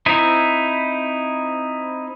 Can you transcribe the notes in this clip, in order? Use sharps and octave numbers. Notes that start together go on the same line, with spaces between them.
C4 D#4 E4